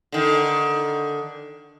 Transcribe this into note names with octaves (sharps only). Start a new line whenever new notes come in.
D3 D#3